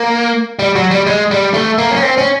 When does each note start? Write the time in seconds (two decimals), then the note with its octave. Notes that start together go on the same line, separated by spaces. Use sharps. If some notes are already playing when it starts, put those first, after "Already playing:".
Already playing: A#3
0.59 G3
0.75 F#3
0.91 G3
1.06 G#3
1.31 G3
1.54 A3
1.78 A#3
1.91 C#4
2.03 C4
2.18 C#4